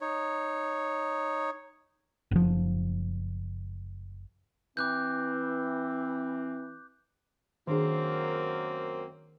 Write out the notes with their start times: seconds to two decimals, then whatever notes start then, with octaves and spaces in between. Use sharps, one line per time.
0.01 D#4 C#5
2.31 F#1 F3
4.77 E3 C4 D6 F#6 G6
7.67 F#2 D#3 A#3 C4 D4 G#4